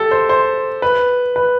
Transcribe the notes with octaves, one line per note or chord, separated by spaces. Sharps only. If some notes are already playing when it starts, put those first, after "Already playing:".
Already playing: G4 A4
C5
C5
B4
B4